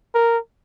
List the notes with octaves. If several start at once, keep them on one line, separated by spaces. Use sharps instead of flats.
A#4